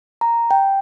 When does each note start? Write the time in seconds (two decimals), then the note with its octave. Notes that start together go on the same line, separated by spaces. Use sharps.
0.21 A#5
0.51 G5